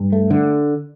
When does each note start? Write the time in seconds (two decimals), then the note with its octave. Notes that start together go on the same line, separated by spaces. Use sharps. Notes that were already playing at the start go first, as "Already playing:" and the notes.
Already playing: G2
0.12 A3
0.30 D3